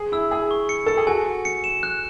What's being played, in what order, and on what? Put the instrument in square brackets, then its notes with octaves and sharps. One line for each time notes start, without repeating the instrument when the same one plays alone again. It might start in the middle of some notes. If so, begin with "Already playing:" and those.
Already playing: [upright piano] G#4
[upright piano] E4 [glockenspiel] E6
[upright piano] G#4 [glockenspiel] E6
[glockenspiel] C#6
C#7
[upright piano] A4 [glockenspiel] C#7
[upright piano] G#4
[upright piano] F#4 [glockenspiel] G#5
[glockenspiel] G#5
C#7
E7
F#6